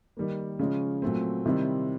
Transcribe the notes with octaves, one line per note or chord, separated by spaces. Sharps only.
D#3 G3 A#3
C#3 F3 G#3 C#4
A#2 F#3 A3 C4
C3 D#3 G3 C4 E4